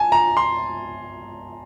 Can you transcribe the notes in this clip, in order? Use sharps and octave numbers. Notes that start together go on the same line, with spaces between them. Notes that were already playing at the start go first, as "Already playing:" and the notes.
Already playing: G#5 A5
A#5
C6